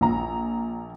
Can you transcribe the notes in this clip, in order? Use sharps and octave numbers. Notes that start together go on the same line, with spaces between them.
A#1 A#5